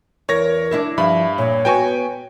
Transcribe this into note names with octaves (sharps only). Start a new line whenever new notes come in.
E2 A#4 C#5 A#6
D4 E4 E5
G2 F3 E5 B5
A#2 C#5
B3 F#4 G5 G#5 C#6